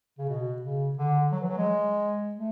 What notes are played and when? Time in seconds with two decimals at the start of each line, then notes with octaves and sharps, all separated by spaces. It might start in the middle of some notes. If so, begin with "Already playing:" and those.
0.18 C#3
0.29 B2
0.62 C#3
0.97 D3
1.32 F#3
1.40 E3
1.49 F#3
1.57 G#3
2.35 A3